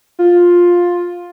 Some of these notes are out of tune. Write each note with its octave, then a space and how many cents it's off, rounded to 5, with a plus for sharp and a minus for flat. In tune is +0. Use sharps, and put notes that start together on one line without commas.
F4 +10